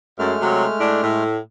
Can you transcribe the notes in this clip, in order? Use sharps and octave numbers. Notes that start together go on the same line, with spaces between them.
F#2 G#3 A3 F6
C3 F#3
A2 D4
A2